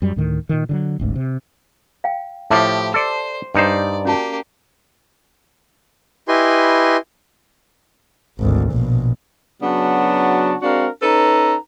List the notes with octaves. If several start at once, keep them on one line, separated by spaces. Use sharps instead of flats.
F#2 G3
D2 A2 D#3
A#2 D#3
D3 D#3 F#3
D1 G#1 D2
C3
F5 G5
A2 F3 G4 E5 A5 D6
A4 C5 D5
G2 D#4 C5 D5
A#3 C#4 F#4 G4 A5
E4 G4 B4 D#5 G#5 C6
G#1 D2
A#1 B2
C#3 F#3 B3 D4 F#4 A5
G#3 C4 D4 F#4 A#4 F5
C#4 D#4 A4 B4 A#5